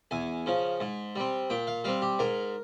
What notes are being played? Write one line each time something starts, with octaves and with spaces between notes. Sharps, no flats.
E2 G#5
C#3 F3
G#2
G3 C4
A#2 G5
F5
G3 C4 F5
G4
G#2 A#4